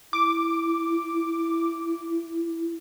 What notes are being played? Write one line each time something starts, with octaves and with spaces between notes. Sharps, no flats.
E4 D6